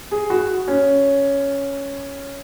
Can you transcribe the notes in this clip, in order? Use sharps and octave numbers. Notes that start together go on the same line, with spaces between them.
G#4
F#4
C#4